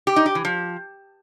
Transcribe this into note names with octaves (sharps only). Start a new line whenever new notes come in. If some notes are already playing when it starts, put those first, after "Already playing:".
G4
D#4
G4
E3
F3